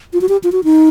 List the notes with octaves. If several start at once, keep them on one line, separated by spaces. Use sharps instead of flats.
F4
F#4
G4
F4
F#4
D#4